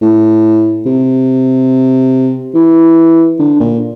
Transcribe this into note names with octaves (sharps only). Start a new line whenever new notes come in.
A2
C3
E3
D3
A#2